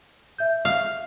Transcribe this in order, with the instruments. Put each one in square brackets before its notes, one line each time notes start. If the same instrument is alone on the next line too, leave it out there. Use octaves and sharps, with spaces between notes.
[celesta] E5 G6
[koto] F5